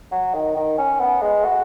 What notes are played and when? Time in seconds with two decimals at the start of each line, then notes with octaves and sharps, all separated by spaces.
0.12 F#3
0.34 D#3
0.56 D#3
0.78 C#4
1.00 B3
1.22 G#3
1.44 F#4